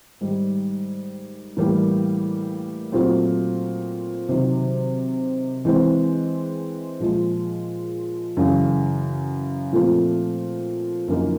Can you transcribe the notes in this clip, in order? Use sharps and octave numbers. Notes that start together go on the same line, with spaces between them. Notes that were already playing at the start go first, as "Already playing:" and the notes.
G#2 D#3 G3
A2 E3 G3 A#3
A#2 F#3 A3 C4
C3 D#3 F#3
E3 G#3 C4
A#2 F3 G#3
F#2 C#3 E3
A#2 F3 A3 C4
F#2 D3 F3 A#3 D#4